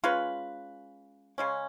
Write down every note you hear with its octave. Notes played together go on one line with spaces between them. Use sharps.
G#3 C#4 F4 B4
C#3 G#3 C#4